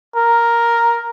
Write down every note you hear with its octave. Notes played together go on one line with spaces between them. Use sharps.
A#4